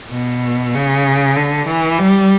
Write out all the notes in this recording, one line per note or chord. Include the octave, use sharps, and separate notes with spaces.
B2
C#3
D3
E3
G3